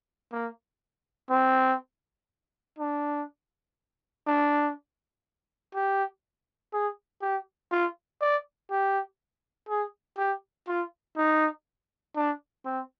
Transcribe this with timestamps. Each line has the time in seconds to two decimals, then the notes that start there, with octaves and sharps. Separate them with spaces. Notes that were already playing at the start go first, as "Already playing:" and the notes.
0.33 A#3
1.30 C4
2.79 D4
4.27 D4
5.74 G4
6.73 G#4
7.22 G4
7.72 F4
8.22 D5
8.71 G4
9.69 G#4
10.18 G4
10.68 F4
11.18 D#4
12.16 D4
12.66 C4